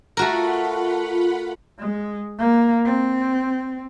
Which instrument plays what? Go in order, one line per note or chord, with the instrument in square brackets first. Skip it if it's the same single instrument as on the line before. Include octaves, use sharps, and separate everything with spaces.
[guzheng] A3 F#4 A#4 [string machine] F4 F#5 B5
[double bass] G#3
A#3
C4